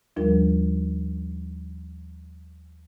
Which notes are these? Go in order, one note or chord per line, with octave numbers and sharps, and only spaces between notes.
D#2 F3 G3 D4 F4 A#4